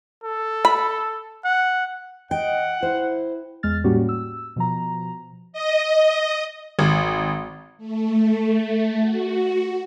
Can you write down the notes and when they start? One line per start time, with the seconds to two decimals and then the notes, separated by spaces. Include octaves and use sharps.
0.24 A4
0.65 B5
1.45 F#5
2.31 D#5 F#5 G5
2.83 E4 C5
3.63 E2 G#3 F6 A6
3.84 A2 G3 A#3 C#4 F#4 G4
4.09 E6
4.56 B2 F3 A#5
5.53 D#5
6.79 G#1
7.77 A3
8.98 F#4